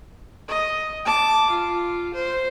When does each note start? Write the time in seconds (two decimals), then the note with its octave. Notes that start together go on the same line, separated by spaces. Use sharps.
0.48 D#5
1.05 A5 D6
1.50 F4
2.14 C5